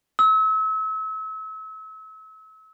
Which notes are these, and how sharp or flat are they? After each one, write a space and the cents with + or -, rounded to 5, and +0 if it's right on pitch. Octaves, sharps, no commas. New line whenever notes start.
E6 -35